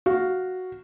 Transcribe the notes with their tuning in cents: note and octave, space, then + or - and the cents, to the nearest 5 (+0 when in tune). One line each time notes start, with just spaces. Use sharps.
F#4 +0 F5 +0